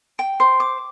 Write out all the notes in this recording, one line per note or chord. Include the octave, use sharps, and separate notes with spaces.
G5
C5
D6